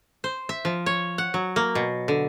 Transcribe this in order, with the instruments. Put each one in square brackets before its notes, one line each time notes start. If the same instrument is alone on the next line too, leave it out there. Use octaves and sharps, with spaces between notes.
[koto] C5
E5
F3
C#5
F#5
F#3
A#3
B2
D3